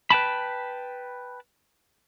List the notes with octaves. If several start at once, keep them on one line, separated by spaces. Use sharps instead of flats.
B4 G5 A5 B5